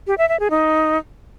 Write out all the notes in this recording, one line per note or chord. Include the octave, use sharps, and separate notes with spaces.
G4
E5
E5
G#4
D#4